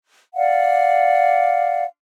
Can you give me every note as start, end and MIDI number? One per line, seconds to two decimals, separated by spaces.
0.35 1.83 74
0.35 1.83 77
0.35 1.83 78